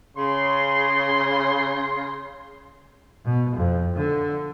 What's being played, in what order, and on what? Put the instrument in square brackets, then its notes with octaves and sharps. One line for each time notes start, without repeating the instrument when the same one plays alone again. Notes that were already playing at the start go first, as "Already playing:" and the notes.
[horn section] C#3 C6
[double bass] B2
F2
D3